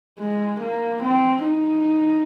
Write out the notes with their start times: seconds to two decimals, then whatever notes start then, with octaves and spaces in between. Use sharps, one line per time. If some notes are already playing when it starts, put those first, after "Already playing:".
0.20 G#3
0.61 A#3
1.03 C4
1.45 D#4